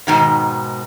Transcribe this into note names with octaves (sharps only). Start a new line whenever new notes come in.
G#2 B2 D#3